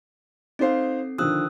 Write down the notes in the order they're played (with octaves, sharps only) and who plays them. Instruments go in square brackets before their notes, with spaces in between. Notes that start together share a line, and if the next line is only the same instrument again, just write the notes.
[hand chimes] C4 A4 C7 [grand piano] D#4 C5 F5
[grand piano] D3 D#3 F3 [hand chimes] D#6 E6 F#6